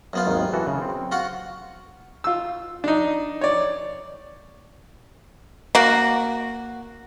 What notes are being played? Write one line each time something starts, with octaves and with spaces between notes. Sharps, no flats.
F#2 B3 F4
G#1 D#2 D#3
E3 F#4 A4
C#3
C4
F4 F#4 F#5
F4 E6
D4 D#4
C#5 D5
A#3 F#4